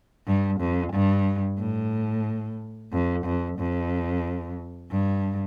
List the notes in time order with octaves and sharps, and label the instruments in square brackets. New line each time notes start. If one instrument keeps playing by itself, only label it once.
[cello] G2
F2
G2
A2
F2
F2
F2
G2